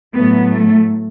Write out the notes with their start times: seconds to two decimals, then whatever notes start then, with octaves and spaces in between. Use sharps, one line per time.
0.16 A2 F#3 A3 B3
0.49 A3